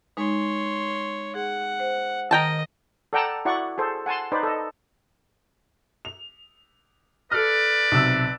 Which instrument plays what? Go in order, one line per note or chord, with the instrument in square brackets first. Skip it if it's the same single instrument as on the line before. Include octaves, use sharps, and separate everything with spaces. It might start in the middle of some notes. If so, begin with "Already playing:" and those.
[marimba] G#3 D#4 [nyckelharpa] C#5 C6
[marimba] G#4 [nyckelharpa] F#5
[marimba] C5
[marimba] D#3 [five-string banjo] A#4 G5 A5 [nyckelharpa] D#5
[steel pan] A4 D5 F#5 G5 A5 A#5
E4 F#4 D5 F#5 C#6
G#4 A4 C5
F#5 G#5 A5 C6
D#4 B4 C5 D5
A4 D#5
[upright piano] F7
[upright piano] A4 F6 [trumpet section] B4 D5
[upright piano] B1 C3 E6